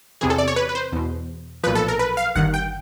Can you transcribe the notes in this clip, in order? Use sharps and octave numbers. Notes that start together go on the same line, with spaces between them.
E2 C3 E3 G#4
A4
D5
C#5
B4
B4
C5
E2 B2
B1 A#2 F3 B4
A4
A#4
B4
F5
G1 G2 D#3 F#5
G5